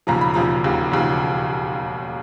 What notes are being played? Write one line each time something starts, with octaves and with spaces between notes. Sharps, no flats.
E1 D#2 C#3 F3 A#5
B5
E1 D#2 C#3 F3 A#5
E1 D#2 C#3 F3
E1 D#2 C#3 F3